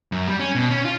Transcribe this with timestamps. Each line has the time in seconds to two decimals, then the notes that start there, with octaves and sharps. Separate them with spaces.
0.12 F#2
0.28 G3
0.40 C#4
0.55 B2
0.70 C#4
0.85 F4